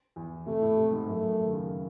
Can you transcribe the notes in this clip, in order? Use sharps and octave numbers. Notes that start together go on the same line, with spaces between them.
E2
C3 A3
A2
C3
G#2
F#2 A3
F#2
D#3
C#3